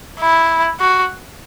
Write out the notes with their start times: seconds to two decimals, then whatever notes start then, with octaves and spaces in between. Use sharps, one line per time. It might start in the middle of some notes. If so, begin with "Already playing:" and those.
0.20 E4
0.80 F#4